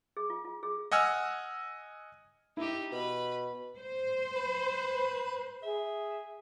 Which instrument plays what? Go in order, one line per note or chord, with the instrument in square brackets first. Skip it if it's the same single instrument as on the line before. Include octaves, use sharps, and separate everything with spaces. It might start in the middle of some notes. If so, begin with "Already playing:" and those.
[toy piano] G#4
F4
F4
G#4
[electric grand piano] D#5 F#5 G#5 E6 F6
[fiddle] D#4 G4 [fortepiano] E4
[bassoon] B2 [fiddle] B4 B5
[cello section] C5
[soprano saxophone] B4
[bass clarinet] G#4 [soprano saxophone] E5